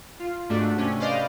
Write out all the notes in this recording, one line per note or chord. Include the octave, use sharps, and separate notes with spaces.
F4
G#2 A3 D4 F#4
C3 A3 C#4
B4 C5 D5 D#5 F5